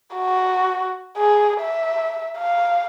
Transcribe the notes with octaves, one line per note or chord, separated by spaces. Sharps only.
F#4
G#4
E5
F5